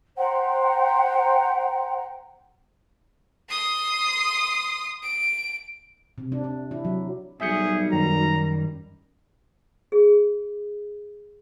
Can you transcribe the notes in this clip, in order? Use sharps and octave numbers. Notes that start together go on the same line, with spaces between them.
C5 F#5 G5 A#5
C6 D#6
D7
C3
D4
D4
E4
F#3
B1 G3 G#4 E5 G6 C#7
F#2 D#3 A#5
G#4